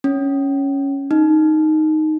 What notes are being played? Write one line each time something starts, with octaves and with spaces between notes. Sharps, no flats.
C#4
D#4